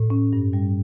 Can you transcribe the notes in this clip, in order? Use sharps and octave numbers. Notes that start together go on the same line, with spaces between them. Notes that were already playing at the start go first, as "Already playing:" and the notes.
Already playing: A2
C#4
G2
G3